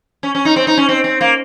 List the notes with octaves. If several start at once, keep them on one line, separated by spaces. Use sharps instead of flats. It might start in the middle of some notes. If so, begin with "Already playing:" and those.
C#4
C#4
D#4
C4
D#4
C#4
C4
C4
A#3